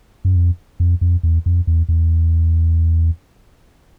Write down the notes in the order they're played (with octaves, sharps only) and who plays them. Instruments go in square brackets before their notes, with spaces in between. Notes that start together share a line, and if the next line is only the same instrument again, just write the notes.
[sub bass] F#2
F2
F2
F2
E2
F2
E2
E2